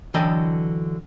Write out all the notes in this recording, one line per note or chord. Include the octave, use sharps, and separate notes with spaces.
D3 E3 F#3 A4 D#5 G5